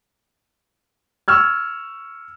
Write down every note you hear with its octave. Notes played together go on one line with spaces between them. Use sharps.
C#6 E6 F6 G#6